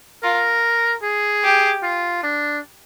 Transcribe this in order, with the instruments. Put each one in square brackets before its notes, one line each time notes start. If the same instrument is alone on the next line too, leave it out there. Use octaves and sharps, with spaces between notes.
[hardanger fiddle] F4 [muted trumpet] A#4
[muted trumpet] G#4
[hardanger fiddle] G4
[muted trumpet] F4
D4